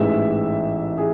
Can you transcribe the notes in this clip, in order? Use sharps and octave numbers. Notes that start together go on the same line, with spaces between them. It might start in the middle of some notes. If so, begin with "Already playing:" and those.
Already playing: A1 G#2 E3 E5
G#4